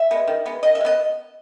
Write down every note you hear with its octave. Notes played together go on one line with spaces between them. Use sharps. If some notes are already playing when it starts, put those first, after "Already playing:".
Already playing: E5
G#3 B3
D#3
G#3 B3
D#3 D#5
E5
G#3
B3 D#5